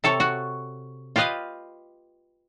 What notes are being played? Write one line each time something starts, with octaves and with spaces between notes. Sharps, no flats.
C3 A4 C#5
F#4
F4 G4 B4 D#5 F5